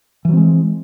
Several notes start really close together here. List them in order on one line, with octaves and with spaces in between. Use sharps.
E3 F#3 C4 G#3